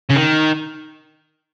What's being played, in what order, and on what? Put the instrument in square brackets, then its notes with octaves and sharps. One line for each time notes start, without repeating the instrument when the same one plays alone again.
[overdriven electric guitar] C#3
D#3